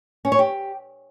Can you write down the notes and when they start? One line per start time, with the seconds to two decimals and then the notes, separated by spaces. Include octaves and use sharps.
0.25 C#4
0.32 C#5
0.39 G4